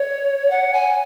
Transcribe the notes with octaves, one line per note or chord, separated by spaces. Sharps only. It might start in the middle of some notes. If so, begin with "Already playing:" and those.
Already playing: C#5
F#5
G#5